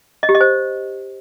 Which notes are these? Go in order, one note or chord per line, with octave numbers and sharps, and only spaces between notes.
D#5
G4
D#5
C5